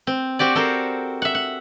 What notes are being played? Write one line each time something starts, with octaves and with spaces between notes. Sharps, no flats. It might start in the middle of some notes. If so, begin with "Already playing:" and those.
C4
C4 F#4 G4 D5
C4 A4 A#4 C5
E5 F#5
F#5